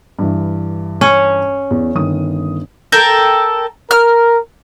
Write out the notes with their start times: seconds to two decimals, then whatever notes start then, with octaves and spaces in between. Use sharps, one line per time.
0.19 G2 E3
1.01 C#4
1.71 E2
1.95 G1 D#3 D#6
2.92 A4 A#4 G5
3.91 A#4 F6